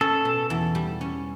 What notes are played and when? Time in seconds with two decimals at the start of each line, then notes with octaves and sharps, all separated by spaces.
0.01 C#4 A4
0.25 B2
0.50 E2
0.75 G3
1.01 C#4